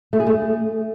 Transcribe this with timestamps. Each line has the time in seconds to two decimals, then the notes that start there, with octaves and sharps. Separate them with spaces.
0.13 A3
0.20 G#4
0.26 A3